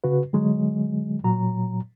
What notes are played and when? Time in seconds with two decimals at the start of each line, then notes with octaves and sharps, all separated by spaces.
0.04 C#3 F#4 B4
0.33 D3 F#3 G#3
1.24 A#2 F#3 A#5